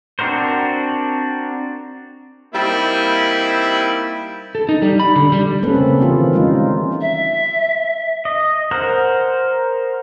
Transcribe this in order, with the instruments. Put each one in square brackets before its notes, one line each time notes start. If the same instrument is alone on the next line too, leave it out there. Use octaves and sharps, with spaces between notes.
[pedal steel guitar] C4 D4 F#4 A#4 C5
[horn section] G3 A#3 C4 D#4 E4
[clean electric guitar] A4
D#4
G3
B5
D3
G3
[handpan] A#3 C4 C#4 A4 B4
C#3 A3 A#3 C4
D#3 E3 F4 G4
G3 G#3 C#4 D#4 F4
[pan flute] E5
[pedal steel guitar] D#5
A#4 C5 F#5